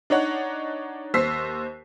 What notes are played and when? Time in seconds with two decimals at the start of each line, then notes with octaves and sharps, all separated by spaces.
0.10 D4 D#4 C#5 F#5
1.14 D#2 C5 E6 B6 C7